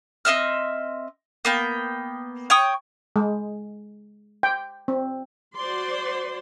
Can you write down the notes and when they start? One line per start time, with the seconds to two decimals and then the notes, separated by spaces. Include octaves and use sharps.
0.25 C4 D#5 E5 F6
1.45 A#3 B3 G5
2.50 C#5 G5 C#6 D#6
3.16 G#3
4.43 G5
4.88 C4
5.57 F#4 C5 D5 C6